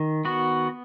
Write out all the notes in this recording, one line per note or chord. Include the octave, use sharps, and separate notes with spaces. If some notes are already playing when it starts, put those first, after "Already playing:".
Already playing: D#3
B3 F#4